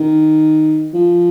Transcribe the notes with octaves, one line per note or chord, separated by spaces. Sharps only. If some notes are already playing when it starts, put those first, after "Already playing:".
Already playing: D#3
F3